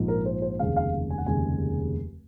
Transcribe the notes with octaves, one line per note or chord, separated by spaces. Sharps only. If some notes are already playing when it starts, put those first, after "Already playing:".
Already playing: A#1 G#2 F3 A#3
A#4
C5
C5
F1 D#2 C#3 G#3 F5
F5
G#5
F#5
F1 D#2 C#3 G#3 G#5